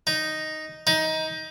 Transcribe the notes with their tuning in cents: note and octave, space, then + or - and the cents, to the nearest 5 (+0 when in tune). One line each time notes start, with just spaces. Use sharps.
D#4 +0
D#4 +20